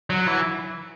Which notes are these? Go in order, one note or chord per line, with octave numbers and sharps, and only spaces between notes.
F#3
E3